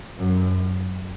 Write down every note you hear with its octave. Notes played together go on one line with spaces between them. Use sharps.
F#2